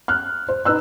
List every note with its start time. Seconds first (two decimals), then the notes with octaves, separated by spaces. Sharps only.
0.08 F6 F#6
0.49 C5
0.65 D#4 B4 E6 F#6